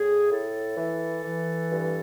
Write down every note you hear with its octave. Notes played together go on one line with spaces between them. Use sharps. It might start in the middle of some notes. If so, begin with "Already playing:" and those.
Already playing: A2 G#4
A2 A4
E3
E3
G2